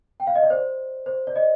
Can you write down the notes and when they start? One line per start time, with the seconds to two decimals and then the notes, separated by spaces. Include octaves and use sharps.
0.20 G5
0.27 F5
0.35 D#5
0.43 D5
0.50 C5
1.06 C5
1.27 D5
1.36 D#5